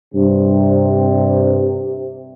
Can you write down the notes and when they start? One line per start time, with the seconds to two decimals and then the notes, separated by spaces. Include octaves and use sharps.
0.14 G2 C3